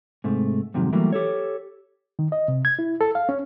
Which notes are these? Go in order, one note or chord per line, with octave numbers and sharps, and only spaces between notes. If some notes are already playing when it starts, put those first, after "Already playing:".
G#2 C3 A3
F2 G#2 C3 D#3 F#3
E3 F#3 G3 A3 A#3
G4 A4 C#5
D#3
D#5
C3
G#6
E4
A4
F5
C#4